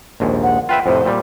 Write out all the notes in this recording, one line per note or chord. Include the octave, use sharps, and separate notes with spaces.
A#1 D#2 G#2
F#5
F4 B4 E5 G5
F2 A2 C3 C5
A#2 G3